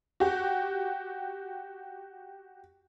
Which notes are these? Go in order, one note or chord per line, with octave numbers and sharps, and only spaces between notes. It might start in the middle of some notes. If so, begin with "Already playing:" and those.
F#4 G4